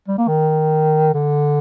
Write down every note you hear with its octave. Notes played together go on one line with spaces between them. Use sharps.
G3
A#3
D#3
D3